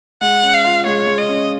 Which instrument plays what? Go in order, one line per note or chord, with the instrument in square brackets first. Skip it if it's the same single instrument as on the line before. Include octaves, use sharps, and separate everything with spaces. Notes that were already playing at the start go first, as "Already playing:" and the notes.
[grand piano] G#3 [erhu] F#5
[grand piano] C#4
[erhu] F5
[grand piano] F4
[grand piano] G#3 [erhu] C#5
[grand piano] G#3
[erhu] D#5
[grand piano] C#4